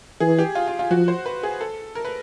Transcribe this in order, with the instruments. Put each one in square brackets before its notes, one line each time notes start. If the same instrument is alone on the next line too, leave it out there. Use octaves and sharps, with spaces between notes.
[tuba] E3 [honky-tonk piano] G#4
[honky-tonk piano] G4
F4
F4
F4
[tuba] F3 [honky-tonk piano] F#4
[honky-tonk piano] C5
B4
G#4
A4
A#4
B4